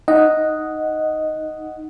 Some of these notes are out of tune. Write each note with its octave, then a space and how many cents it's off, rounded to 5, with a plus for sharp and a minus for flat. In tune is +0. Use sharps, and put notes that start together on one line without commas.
D#4 +0 D#5 +0 F#5 +0